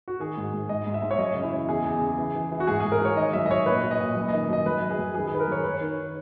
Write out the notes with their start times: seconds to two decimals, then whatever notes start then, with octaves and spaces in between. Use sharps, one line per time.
0.08 F#4
0.20 D#3 G#4
0.37 G#2
0.53 G#2
0.69 G#2 D#5
0.87 G#2
0.94 E5
1.02 G#2
1.11 C#5
1.18 F#2 D#5
1.35 C#3
1.44 E4
1.52 E3
1.68 E2 G#4
1.85 E2
2.01 C#3
2.18 E3
2.35 E3
2.52 E3
2.60 F#4
2.67 G#2 G#4
2.80 G#2 G#4
2.92 A#4
3.00 G#2 C#5
3.17 D#3 D#5
3.33 F#2 E5
3.46 D#5
3.49 F#2 C#5
3.66 A#2 B4
3.83 A#2
3.91 D#5
4.00 A#2
4.16 F#2
4.28 D#3 D#5
4.49 F#2 D#5
4.66 F#2 B4
4.81 F#2
4.90 G#4
4.99 F#2
5.14 D#3 G#4
5.27 G#4
5.32 D#3 B4
5.40 A#4
5.48 F#2 C#5
5.63 D#3 B4
5.74 C#5
5.81 D#3